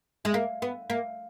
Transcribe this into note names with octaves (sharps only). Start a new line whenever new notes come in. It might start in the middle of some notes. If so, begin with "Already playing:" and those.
G#3
A#3
B3
A#3